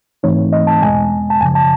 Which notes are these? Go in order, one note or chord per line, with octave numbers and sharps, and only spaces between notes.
G#2 E3 A3 C4 D#4 C#5
D#5
A5
E2 B2 G#3 G#5
A5
F#2 C#3 F3 G#5
A5